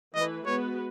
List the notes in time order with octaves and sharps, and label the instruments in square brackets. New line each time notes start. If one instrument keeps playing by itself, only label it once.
[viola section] E3 A3 E4 B4 [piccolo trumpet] D#5
[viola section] G#3 B3 F#4 B4 [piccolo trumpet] C#5